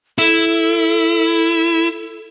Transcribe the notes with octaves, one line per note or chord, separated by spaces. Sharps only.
E4 A4